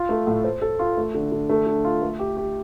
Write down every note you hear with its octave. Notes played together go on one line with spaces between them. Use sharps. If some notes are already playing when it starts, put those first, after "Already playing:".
Already playing: F4
A3
A2
C5
A4
F4
A3
D3
D3
A3
D3
F4
A3
G4
G4